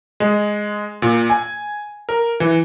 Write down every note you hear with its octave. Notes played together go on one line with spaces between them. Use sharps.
G#3
A#2
G#5
A#4
E3